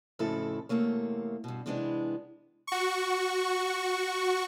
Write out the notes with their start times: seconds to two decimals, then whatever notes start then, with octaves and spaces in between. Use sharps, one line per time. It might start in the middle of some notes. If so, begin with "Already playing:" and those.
0.19 F2 A2 C#3 E4 F#4 A4
0.69 E2 C3 A3 A#3 C#5
1.44 G2 B2
1.66 C3 E3 G#3 B3 D4
2.67 F#4 C#6